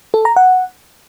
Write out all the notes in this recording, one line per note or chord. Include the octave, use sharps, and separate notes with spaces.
A4
A#5
F#5